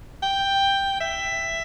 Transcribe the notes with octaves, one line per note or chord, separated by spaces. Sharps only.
G5
E5